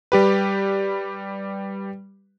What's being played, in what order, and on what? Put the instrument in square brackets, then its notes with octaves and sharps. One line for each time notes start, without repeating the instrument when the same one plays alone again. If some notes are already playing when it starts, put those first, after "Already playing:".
[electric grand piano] G3 G4 B4